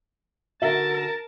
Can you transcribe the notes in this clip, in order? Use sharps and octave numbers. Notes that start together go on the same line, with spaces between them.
D3 D#4 F#4 A#4 E5 A5